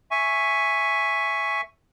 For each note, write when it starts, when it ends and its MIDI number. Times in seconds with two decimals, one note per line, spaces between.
0.11 1.61 76
0.11 1.61 80
0.11 1.61 85